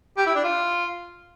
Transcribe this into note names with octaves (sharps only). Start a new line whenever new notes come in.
G4
E4
D4
F4